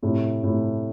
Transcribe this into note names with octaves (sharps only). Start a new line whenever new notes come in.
A2 C3
A2 C3